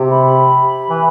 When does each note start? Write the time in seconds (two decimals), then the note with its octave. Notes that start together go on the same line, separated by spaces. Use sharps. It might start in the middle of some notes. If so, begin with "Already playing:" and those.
Already playing: C3
0.11 B5
0.90 E3